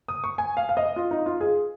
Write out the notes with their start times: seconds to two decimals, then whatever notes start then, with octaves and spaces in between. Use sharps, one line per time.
0.08 D#6
0.24 C#6
0.38 G#5
0.57 F5
0.69 F5
0.77 D#5
0.96 F4
1.11 D#4
1.26 F4
1.41 G#4